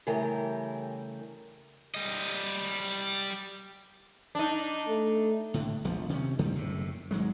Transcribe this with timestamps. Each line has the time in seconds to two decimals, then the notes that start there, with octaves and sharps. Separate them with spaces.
0.07 C#3 E3 G3 A3 G4 A#4
1.95 G3 D#5
4.35 D4 D#4
4.88 A3
5.54 A2 D3
5.84 E1 A#1 F3
6.09 C3 D#3 C#4
6.39 G2 D#3 F3 G3
6.55 F#1 A2 C3
7.11 G#1 G#2 F#3 G#3